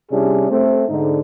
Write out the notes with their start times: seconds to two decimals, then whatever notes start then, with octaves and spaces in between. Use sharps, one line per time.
0.11 C3 G3 C#4 D4 E4 G#4
0.50 A3 C4
0.89 G#2 D3 D#4